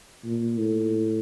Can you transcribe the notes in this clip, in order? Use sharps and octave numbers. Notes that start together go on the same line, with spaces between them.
A#2
A2